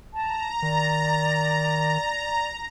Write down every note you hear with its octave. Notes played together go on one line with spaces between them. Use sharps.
A5 A#5
D#3 D5